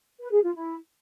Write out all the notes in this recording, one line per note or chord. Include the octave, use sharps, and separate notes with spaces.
B4
G#4
F4
E4